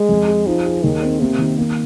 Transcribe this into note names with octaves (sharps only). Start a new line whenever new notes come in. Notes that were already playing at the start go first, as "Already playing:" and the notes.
Already playing: G#3 G#4
F2
G#4
F3 D#4
G#4
D#2 D#3
C4
C3 A#3
D#3
A#3